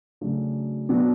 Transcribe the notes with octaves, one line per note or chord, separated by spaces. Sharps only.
C#3 F#3 A3 D4 F#4
B2 F#3 B3 D4